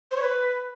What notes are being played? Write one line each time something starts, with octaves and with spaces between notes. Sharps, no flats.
C5
C#5
B4